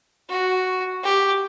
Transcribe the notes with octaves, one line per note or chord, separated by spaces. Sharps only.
F#4
G4